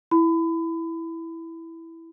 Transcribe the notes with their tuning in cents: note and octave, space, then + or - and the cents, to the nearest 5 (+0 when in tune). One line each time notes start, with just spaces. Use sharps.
E4 +0 B5 +30